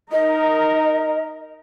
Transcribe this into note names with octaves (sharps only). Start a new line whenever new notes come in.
D#4 A#4 D#5